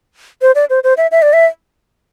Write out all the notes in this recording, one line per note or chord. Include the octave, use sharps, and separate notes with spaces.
C5
D5
C5
C5
E5
E5
D5
E5